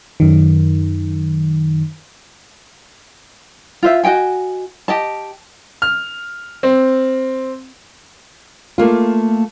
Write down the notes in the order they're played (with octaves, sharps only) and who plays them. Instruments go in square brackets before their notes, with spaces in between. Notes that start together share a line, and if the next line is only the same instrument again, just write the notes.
[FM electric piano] F#2 D#3
[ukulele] F4 C5 E5
F#4 D#5 G5 G#5
G4 D#5 A5
[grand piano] F6
C4
[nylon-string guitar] A3 A#3 F4